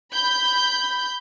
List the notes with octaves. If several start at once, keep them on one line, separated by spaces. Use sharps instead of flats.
B5 G6